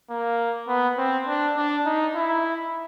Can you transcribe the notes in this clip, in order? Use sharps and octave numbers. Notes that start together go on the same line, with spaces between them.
A#3
B3
C4
D4
D4
D#4
E4